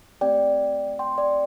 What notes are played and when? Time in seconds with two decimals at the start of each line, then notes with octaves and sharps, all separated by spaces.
0.21 A3 C4 G4 D5 G5
0.99 G5 C6
1.18 D5 G5